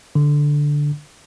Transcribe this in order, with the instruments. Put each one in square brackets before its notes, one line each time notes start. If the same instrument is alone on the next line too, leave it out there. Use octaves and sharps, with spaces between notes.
[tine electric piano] D3